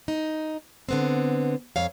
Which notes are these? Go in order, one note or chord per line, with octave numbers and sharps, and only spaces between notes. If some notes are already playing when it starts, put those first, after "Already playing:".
D#4
D3 B3 C4
F2 C#5 F5